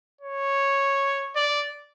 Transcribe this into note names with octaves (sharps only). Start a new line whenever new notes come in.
C#5
D5